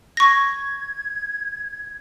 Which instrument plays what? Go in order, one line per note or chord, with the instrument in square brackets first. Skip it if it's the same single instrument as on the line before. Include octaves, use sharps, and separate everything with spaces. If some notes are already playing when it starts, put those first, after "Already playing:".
[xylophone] C#6 A#6 [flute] G#6